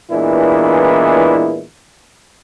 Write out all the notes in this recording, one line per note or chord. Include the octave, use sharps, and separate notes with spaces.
A#2 E3 G#3 B3 D4 E4